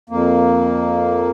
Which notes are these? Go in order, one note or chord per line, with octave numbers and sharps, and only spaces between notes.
F2 A#3